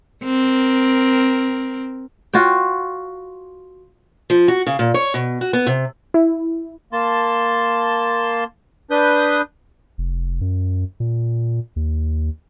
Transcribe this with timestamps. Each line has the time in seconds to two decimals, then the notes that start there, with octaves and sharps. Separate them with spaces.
0.24 C4 A#4
2.33 F4 F#4 C#5 G5
4.30 F3
4.48 F#4
4.67 C#3
4.79 A#2
4.94 C#5
5.14 B2
5.41 F#4
5.53 B3
5.67 C3
6.14 E4
6.93 A#3 A5 C6
8.91 D4 B4 D#6 G6
9.98 F1
10.41 F#2
11.00 A#2
11.76 D#2